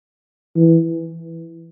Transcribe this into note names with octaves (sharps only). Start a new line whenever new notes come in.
E3